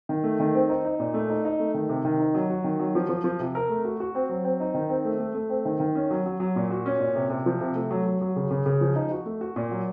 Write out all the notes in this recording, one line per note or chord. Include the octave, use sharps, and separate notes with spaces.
D#3
A3
D#3
C4
D#4
D#4
A#2
A3
D#4
D#4
A3
D#3
C3
D#3
D#4
F#3
F#4
D#3
F#3
F3
F3
F3
C3
A#4
A3
F#4
F#4
C4
F#3
C4
D#4
D#3
C4
A3
A3
A3
C4
D#3
D#3
C#4
F#3
F#3
F#3
A#2
F#4
C#4
A#2
C3
C3
F3
C3
A3
F#3
F#3
F#3
C#3
C#3
C#3
F3
D#4
F#4
A3
F#4
A#2
F#3